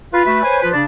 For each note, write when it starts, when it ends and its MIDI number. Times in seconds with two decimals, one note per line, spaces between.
0.13 0.24 65
0.13 0.60 71
0.26 0.43 57
0.26 0.43 66
0.26 0.43 76
0.43 0.62 72
0.43 0.62 73
0.43 0.62 80
0.63 0.70 53
0.63 0.70 65
0.63 0.70 71
0.74 0.85 49
0.74 0.85 62